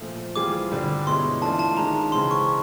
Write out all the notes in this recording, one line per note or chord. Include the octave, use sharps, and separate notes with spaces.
A#2 F3 A3
E3 G3 C4 F4 G#4 D6
G2 D3 G3
B2 G#3 C#4 E4 C6
E3 A3 D4 F4 A5
A5
D#3 G#3 C#4 F4 A#5
C#3 E3 G#3 C4 C6
C#6